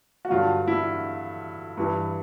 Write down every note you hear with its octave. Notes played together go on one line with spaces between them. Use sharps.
F#4
G2 D3 F#3 F4
E4
G2 E3